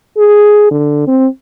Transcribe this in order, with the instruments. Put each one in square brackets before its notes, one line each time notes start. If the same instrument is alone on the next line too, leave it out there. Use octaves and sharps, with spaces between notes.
[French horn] G#4
D3
C4